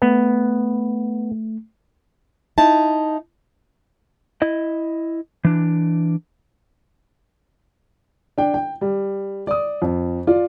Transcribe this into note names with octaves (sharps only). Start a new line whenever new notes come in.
A3 B3
D#4 E4 A5
E4 D#5
E3 D4
D4 G5
G5
G3
D5 D#6
F2
F4 D5